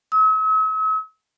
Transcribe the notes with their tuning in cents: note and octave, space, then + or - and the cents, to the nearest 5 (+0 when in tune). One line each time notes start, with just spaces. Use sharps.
E6 -45